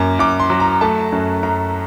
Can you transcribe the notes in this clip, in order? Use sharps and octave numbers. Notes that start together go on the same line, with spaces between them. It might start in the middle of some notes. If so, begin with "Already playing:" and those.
Already playing: F#2 A#3 D6
F#2 D6
C6
F#3
A#5
A3 A5
F#2
F#2 A#5